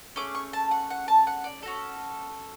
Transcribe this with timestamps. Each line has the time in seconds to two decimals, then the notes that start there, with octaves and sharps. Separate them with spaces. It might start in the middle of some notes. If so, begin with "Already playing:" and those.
0.16 A3 C#4 G#4 D6
0.35 C#6
0.53 A5
0.71 F#5
0.90 F#5
1.08 A5
1.27 F#5
1.44 D5
1.63 C#4 F#4 A4